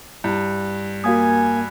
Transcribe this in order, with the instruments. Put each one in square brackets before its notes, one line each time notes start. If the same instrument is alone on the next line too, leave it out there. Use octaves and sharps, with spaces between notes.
[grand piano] G2 [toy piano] E4
[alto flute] A#3 [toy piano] F#4 F5 D#6 [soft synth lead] G#5